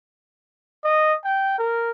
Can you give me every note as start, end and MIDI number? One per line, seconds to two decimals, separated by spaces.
0.84 1.14 75
1.24 1.55 79
1.59 1.91 70